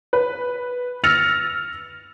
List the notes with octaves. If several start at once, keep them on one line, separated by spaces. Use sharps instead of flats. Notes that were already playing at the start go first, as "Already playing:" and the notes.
B4
E6 F6 A6 A#6 C#7 F7